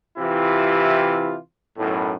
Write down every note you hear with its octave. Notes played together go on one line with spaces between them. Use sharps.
C3 E3 E4 F4 G4
B1 F#2 A2